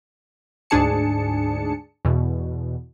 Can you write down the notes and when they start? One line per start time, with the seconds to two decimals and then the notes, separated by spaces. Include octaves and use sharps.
0.70 D2 G#2 D4 G#4 A5 C#7
2.05 E2 B2